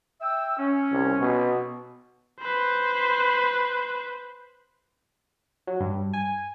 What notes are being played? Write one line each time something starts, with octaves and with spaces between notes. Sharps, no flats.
E5 G5 E6
C#4
C2
B2
B4 C5
F#3
G2
G#5